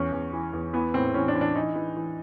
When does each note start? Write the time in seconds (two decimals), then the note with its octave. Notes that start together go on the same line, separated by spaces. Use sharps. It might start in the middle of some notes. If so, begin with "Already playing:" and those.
Already playing: E2 C#4
0.12 E2
0.33 E3
0.53 E2
0.73 E3 B3
0.94 A2 C4
1.14 E3 C#4
1.28 D4
1.35 E3
1.41 D4
1.55 E3 D#4
1.75 E3
1.96 E3